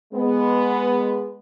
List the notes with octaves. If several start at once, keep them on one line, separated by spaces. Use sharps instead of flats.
G#3 B3